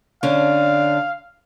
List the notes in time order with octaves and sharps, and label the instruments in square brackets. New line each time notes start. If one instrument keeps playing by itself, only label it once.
[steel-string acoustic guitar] D3 C#4 D4 [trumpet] F5